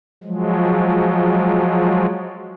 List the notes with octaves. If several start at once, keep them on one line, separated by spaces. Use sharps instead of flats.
F3 F#3 G#3